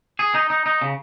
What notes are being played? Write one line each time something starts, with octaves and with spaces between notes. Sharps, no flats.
G#4
D#4
D#4
D#4
C#3